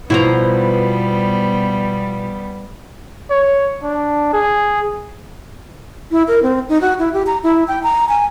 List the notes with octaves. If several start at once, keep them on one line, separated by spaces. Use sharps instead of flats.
B2 F3 G3 B3 E4 A#5
C#5
D4
G#4
E4
A#4
C4
D#4
F#4
E4
G4
A#5
E4
G5
A#5
G#5